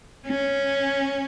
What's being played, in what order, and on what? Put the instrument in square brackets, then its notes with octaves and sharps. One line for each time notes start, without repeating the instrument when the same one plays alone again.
[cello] C#4